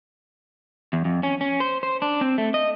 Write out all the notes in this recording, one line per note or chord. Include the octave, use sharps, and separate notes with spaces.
E2
F2
C#4
C#4
C5
C5
D4
C4
A3
D#5